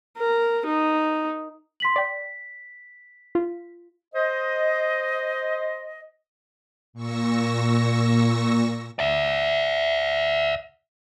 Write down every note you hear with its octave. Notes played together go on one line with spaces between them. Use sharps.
A#4
D#4
C6 B6 F#7
D5 G5 B6
F4
C5 D#5
A#2 C#6 E6 A#6
D5 E5